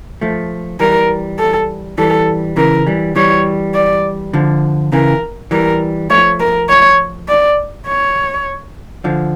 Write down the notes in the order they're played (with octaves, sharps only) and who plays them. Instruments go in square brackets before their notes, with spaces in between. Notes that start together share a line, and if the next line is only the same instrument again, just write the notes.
[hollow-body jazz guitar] F3 A3
[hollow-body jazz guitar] E3 G3 [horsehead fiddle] A#4
[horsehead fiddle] A4
[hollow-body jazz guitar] E3 G3 [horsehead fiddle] A4
[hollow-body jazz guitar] C#3 E3 [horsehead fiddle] A#4
[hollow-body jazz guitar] E3 G3
[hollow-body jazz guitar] E3 G3 [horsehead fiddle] C#5
[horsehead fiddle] D5
[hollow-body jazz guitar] D3 F3
[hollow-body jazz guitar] C#3 E3 [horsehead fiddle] A#4
[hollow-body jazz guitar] E3 G3 [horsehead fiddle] A#4
[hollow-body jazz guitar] F3 A3 [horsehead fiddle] C#5
[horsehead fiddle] A#4
C#5
D5
C#5
[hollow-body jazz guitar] D3 F3